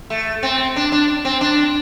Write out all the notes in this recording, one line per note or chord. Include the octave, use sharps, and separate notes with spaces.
A3
C4
D4
D4
C4
D4